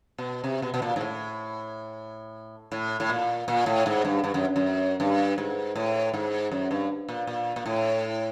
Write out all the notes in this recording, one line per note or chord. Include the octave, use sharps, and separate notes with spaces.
B2
C3
B2
B2
A#2
G#2
A2
A2
A2
A#2
A#2
A2
G#2
G2
G2
F#2
F#2
G2
G#2
A2
G#2
F#2
G2
A#2
A#2
A#2
A2